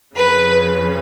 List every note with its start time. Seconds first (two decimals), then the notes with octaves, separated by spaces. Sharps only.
0.16 F2 C#3 B4